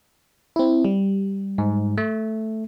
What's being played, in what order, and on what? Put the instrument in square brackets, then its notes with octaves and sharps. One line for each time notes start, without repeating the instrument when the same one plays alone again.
[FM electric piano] C4 E4
G3
[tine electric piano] G#2
A3